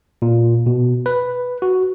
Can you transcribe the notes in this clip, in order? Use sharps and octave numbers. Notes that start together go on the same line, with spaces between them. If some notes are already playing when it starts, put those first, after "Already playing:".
A#2
B2
B4
F#4